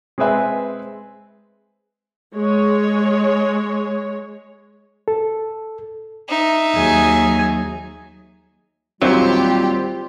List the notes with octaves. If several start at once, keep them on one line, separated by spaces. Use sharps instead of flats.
G#3 C4 G#4 B4 E5 G#5
G#3 C#5
A4
D#4 E5
D#2 F#3 G#4 G#5
D#2 A#2 F#3 G3 C4 F4 G4 C5